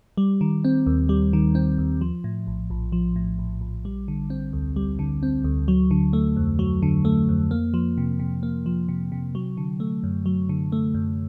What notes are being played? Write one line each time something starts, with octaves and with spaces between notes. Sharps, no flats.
G3
D#3
C4
D#2
G3
D#3
C4
D#2
F3
A2
A#1
A#1
F3
A2
A#1
A#1
G3
D3
C4
D2
G3
D3
C4
D2
F#3
D3
A3
F2
F#3
D3
A3
F2
A#3
F3
C3
C3
A#3
F3
C3
C3
F#3
D3
A3
F#2
F#3
D3
A3
F#2